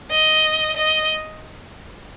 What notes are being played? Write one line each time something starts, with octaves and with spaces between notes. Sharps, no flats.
D#5
D#5